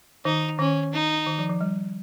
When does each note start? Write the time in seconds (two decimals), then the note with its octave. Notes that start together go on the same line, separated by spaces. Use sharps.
0.25 D#3 D#4
0.59 D#3 C#4
0.93 D#4
1.27 D#3
1.39 F3
1.50 F3
1.61 G3